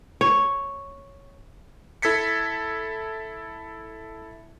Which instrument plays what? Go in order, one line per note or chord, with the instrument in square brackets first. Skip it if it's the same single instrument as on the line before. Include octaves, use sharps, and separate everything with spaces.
[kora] C#5
[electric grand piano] E4 A4 G#6 B6 C#7